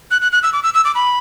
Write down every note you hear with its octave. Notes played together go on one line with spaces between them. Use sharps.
F#6
F#6
F#6
E6
D6
E6
E6
D6
B5